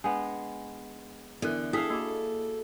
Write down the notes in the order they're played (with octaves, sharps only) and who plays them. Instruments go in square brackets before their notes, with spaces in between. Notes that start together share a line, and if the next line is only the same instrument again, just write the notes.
[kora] G#3 B3 [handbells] D4 [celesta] G#5
[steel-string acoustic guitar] D3 [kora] E3 [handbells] B3 A#4 F#6
[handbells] D4 [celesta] E4 B6 [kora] G#4 E5 F5 [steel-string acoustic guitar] A4
[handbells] A#3 F#4 D6